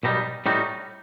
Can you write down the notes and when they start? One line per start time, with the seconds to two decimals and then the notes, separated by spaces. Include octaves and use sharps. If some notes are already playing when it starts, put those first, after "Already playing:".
0.03 B1 B2 G3 D#4
0.46 A2 G3 D#4 F#4